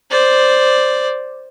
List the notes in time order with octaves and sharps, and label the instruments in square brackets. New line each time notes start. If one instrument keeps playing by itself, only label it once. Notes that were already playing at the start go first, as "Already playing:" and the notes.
[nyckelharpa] C5 D5